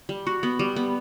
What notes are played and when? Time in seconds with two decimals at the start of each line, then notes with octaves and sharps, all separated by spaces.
0.09 G3
0.27 F#4
0.43 B3
0.59 G3
0.76 B3